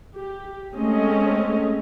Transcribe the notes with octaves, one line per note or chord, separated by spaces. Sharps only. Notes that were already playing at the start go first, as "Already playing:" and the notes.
G4
G#3 A3 C4 C#4 D#5